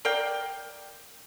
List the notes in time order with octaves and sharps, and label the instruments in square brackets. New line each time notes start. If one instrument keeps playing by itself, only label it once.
[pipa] A#4 D5 F5 G5